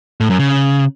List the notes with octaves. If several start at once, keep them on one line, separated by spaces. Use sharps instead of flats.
A2
F#2
C#3